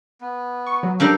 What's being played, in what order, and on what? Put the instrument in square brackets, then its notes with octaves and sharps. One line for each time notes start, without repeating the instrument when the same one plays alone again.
[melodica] B3
[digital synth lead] C#6
F#3
[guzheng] G3 D4 A#4 [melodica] A4 F5 G5